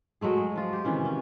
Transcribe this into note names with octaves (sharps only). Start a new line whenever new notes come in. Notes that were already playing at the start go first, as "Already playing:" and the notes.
F#3 G#3 A3 G#4
G#4
F3 F4
G4
C3 D#3 E3 C#4
C#4